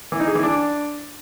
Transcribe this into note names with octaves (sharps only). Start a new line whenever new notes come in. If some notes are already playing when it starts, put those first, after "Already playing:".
E3
D#4
G#4
E3
D4